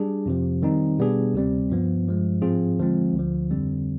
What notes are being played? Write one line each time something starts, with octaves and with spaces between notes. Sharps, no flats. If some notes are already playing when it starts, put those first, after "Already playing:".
Already playing: G3 D4 G#4
F2 C3 F3
D#3 G3 C4 D#4
B2 G3 B3 D4 G#4
D2 C3 G3 C4
G2 F3 B3
G2 F3 G#3
G#2 F3 C4 F4 G#4
D#2 D3 F3 G#3 C4
D2 D3 F3
F2 D3 G3 C4